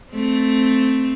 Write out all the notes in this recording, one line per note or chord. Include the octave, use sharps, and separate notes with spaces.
A3 C4